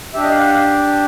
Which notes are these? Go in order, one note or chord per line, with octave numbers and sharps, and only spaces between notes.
D4 G4 E5
D#5
F5
F#5
F5